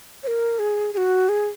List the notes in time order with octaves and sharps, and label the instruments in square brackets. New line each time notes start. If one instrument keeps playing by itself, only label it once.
[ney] C#5
A#4
G#4
G#4
F#4
G#4